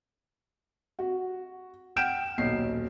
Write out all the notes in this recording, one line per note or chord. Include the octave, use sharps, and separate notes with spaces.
F#4
F#5 G5 F6 G6 D7 E7
D#1 B1 C7